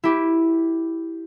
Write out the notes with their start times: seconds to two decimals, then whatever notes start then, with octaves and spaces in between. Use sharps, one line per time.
0.03 E4 G4